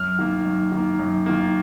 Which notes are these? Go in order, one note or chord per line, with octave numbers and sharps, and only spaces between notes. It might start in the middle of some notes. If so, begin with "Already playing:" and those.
Already playing: F#2 F6
D#3 A#3
F#2
D#3 A#3
F#2
D#3 A#3